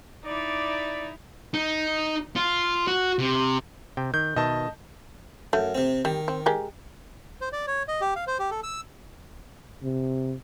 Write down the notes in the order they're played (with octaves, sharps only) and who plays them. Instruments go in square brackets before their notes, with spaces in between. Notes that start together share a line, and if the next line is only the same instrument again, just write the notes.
[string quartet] D#4 E4 [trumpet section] D5
[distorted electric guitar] D#4
F4
F#4
C3
[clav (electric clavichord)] C3 G5
[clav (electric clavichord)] D#3 [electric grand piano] G6
[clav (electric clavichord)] B2 D#3 E5 [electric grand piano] D#5 A5
[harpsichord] F#2 [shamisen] A3
[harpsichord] C3 C4
[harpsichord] D#3 [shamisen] G3
[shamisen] C4
G#3 G4 A#4
[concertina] C5
D5
C#5
D#5
G4
F5
C5
G4
A4
E6
[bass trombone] C3